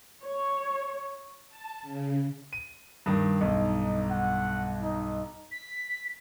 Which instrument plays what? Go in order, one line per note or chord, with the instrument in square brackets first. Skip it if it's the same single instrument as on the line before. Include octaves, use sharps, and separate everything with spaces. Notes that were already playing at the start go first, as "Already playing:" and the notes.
[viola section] C#5
[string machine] A5
C#3
[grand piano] D#7
G2 D#3
[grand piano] B1 G2 [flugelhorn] D#4
[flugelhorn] F#5
D#4
[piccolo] B6